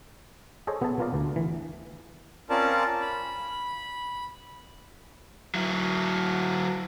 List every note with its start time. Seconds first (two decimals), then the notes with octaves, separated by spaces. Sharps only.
0.67 G#4 A4 C5 C#5 D#5
0.82 B3 G#4 E5 A5
0.99 B3 F4 A#4 D5 F5
1.14 D2
1.36 E3
2.50 C4 C#4 F4 A#4 D5 A5
3.01 B5
5.55 F#3 E4